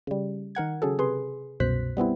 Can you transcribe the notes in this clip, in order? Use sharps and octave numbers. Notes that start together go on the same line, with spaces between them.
C#3 G3
D#3 A#4 F#5 G#6
C#3 F#3 G#4 A4
C3 G#4 B4 C6
C2 F#2 B2 C5 F#6 B6
G3 B3 C4 E4